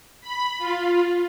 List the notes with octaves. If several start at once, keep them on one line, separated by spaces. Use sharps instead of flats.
B5
F4